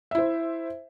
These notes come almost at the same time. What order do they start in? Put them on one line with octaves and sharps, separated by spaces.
E5 E4 C5